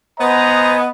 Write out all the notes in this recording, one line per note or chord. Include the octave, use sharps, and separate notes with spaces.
B3 C5 D#5 G#5 A#5